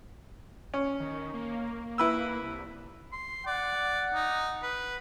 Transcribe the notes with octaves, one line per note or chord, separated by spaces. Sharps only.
C#4
D#3
A#3
E4 B4 E6
C2
C6
D5 F#5
D#4
B4